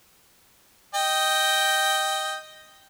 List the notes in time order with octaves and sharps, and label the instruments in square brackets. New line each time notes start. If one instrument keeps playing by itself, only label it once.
[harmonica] D#5 G5